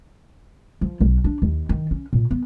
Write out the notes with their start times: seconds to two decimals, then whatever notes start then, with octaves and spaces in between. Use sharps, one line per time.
0.81 F3
1.01 B1
1.24 D4
1.42 D#2
1.69 D#3
1.91 C#4
2.13 A#2
2.31 B3